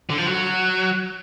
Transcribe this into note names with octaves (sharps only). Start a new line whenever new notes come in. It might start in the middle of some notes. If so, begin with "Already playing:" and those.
D3
F3
F#3